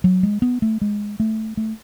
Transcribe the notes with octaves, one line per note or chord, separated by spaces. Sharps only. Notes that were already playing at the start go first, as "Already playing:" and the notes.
F#3
G#3
B3
A3
G#3
A3
A3